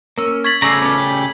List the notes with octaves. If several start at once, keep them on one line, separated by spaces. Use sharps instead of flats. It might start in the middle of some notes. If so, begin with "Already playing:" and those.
A#3 C#4 A#4 E6
C#6 G#6 A6 B6 F#7
C#3 A3 G#4 D5 A#5 C#6 E6 C7
B3 C#4 A4 D6
G4